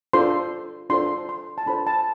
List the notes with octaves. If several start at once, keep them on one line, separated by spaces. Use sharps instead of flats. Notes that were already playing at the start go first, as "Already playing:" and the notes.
D4 F4 A4 C5 C6
D4 F4 A4 C5 C6
C6
A5
D4 F4 A4 C5 B5
A5